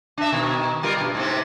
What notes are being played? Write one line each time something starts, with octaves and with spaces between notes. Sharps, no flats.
D4 E5
B2 D#3
G3 F4 A#4
G2 B2
G#2 C3 C4